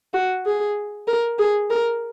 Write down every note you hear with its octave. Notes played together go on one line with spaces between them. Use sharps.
F#4
G#4
A#4
G#4
A#4